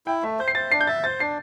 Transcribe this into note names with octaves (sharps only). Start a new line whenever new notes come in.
E4 G5
A3 E5
C5 G6
C7
C5 A6
D4 C7
G6
E5 A6
C5 A6
D4 C7